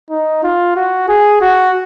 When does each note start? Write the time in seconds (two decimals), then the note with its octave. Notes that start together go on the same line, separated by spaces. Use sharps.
0.10 D#4
0.43 F4
0.76 F#4
1.08 G#4
1.41 F#4